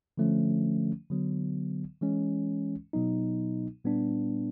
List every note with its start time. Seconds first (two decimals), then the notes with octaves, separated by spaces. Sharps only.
0.18 D3 F3 A3 C#4
1.10 D3 F#3 B3
2.01 E3 G#3 C#4
2.93 B2 F#3 B3 D#4
3.84 A#2 G3 B3 D4